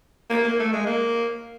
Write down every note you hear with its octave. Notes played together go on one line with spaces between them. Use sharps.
A#3
A#3
A3
G#3
A#3